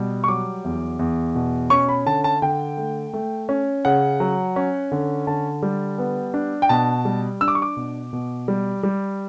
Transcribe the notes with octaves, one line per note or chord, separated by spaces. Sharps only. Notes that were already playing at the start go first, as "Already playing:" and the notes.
Already playing: B2 G3
C#6
F#3 D6
E2
E2
B2
C#4 C#6
B5
D3 A5
A5
D3 G5
A3
A3
C#4
C#3 F#5
F#3
C#4
D3
D3 A5
G3
B3
D4
G5
B2 A5
G3
D4 E6
D6
C#6
D6
B2
B2
G3
G3